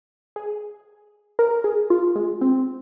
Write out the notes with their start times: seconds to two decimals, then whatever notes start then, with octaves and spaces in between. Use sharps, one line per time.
0.36 G#4
1.39 A#4
1.64 G#4
1.90 F4
2.16 G#3
2.41 C4